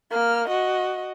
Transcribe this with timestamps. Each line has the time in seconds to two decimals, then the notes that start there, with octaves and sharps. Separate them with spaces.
0.11 A#3 F6
0.48 F#4 D#5